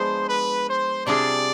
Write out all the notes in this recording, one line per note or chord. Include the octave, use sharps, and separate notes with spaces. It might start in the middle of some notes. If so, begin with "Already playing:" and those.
Already playing: F3 G#3 B3 D4 G#4 C5
B4
C5
C3 G3 D4 F4 G#4 D5